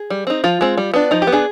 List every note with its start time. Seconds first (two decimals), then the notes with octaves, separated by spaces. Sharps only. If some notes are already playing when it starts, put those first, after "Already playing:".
Already playing: G#4
0.10 G3
0.27 C4 D#4
0.44 F3 F4
0.61 G#3 C4
0.78 G3
0.94 B3 D4
1.11 F3 D#4
1.22 G4
1.27 B3
1.32 D4 G#4